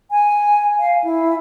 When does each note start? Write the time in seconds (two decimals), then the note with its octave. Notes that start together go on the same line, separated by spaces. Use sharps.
0.11 G#5
0.79 F5
1.04 E4